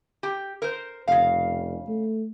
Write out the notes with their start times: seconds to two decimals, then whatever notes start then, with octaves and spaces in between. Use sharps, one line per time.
0.23 G4
0.62 A#4 C5
1.08 F1 C#3 F5
1.88 A3